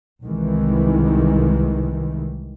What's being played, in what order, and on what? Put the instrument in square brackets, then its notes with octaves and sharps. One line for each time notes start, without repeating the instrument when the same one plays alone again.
[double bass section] C2 D#3 E3 G#3